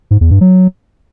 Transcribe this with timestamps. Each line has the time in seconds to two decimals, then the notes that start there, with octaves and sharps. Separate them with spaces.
0.11 G#2
0.21 E2
0.31 G2
0.41 F#3